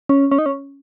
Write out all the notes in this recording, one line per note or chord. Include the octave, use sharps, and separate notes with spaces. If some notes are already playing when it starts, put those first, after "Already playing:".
C#4
C#4
D#4
C#4